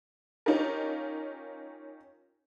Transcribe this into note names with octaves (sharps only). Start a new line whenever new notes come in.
C#4 D#4 F4 G4 A#4